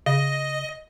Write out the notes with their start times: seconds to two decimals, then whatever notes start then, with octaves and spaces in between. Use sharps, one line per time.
0.06 C#3 D#5